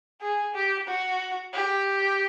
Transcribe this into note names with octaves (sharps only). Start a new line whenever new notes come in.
G#4
G4
F#4
G4